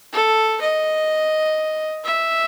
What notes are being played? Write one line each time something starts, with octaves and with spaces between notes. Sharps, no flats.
A4
D#5
E5